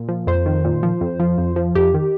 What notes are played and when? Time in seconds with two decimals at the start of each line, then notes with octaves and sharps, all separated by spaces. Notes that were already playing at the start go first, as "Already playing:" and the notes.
Already playing: A#2
0.08 F3
0.27 F2 C5
0.46 D#3
0.65 A#2
0.83 F3
1.01 F2
1.19 F3
1.38 F2
1.56 F3
1.75 F2 G4
1.94 D#3